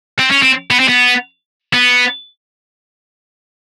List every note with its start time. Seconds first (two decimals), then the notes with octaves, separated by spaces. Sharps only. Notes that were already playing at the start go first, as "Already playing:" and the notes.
0.19 C4
0.31 C#4
0.42 C4
0.71 B3
0.80 C4
0.88 B3
1.73 B3